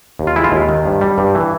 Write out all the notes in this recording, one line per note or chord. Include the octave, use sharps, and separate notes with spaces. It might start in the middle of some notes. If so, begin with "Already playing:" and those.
D#2
F4
G#3 E4
F4
D#2
D#3
G2
G3
G2
E3